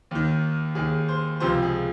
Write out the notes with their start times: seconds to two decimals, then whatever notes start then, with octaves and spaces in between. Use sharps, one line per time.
0.11 D#2 D#3
0.75 D#2 D#3 G#4
1.08 C5
1.40 C#2 C3 F3 C5
1.63 G#4